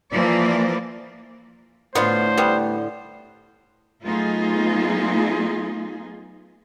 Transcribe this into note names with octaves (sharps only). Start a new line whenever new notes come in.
E3 F3 A#3 D5
A2 D3 A3 B3 F4 C5
G3 B3
F#3 A3 B3 D#4 F4 G#4